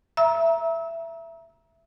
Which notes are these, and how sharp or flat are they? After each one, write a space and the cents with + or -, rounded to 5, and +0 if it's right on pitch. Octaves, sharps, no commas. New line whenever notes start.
E5 +15 A#5 +25 E6 -30